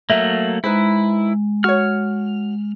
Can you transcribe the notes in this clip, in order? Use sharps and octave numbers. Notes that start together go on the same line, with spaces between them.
F#3 A3 A#3 E5
G#3 D#4 E4 B4 C5
F#4 C#5 F6